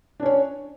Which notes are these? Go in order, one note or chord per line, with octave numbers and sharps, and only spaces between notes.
C#4 D4 C#5